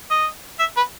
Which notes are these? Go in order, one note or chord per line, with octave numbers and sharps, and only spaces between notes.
D#5
E5
B4